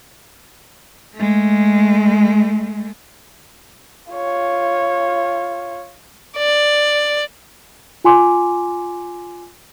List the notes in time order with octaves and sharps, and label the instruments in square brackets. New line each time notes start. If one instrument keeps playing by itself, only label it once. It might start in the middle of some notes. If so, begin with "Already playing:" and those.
[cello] G#3 A3
[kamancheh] F4 C#5
[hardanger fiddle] D5
[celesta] F4 G#5 C6 D6